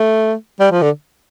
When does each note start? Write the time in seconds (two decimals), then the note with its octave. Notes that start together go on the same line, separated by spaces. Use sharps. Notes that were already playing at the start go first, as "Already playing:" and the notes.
Already playing: A3
0.60 G3
0.71 F3
0.82 D3